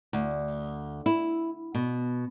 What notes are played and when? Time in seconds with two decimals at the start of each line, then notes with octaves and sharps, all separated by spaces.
0.13 D2
1.06 E4
1.75 B2